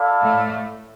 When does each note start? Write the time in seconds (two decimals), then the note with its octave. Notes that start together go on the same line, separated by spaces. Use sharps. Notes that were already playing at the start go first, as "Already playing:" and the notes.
Already playing: E4 A4 D5 F5
0.23 A2 A3